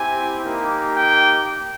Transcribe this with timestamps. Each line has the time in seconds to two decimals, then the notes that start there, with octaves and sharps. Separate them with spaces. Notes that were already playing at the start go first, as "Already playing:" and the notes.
Already playing: C4 E4 G4 G#5
0.45 A#3 D#4 G4
0.94 G5